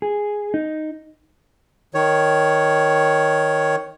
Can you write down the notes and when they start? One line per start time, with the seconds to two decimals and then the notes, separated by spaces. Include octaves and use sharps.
0.02 G#4
0.54 D#4
1.94 D#3 C#5